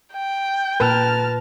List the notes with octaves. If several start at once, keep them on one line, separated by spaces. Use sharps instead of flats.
G5
A#2 A#4 B4 A5 F6